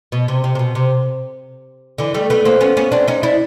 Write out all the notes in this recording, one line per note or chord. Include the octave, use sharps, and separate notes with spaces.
B2
C3
C3
C3
B2
C3
D3 E3
G3 A3
A3 B3
A#3 C4
B3 C#4
B3 C#4
C4 D4
C#4 D#4
D4 E4